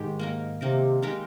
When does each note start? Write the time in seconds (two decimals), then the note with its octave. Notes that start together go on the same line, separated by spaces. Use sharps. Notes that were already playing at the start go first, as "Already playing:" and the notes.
Already playing: G#2 D#3 G#3 G4
0.19 A#3 D#4 A#4
0.61 C3 A#3 D#4 A#4
1.02 G#3 D#4 G4 A#4